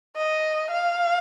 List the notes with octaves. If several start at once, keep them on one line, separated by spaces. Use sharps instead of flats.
D#5
F5